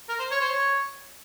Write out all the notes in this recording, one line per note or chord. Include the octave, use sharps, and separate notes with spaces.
A#4
C5
C#5
C5
C#5